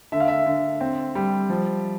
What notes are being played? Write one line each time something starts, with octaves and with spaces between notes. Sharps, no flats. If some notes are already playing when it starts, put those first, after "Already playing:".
D3 E5
F5
E5
D3
C4
G3
F3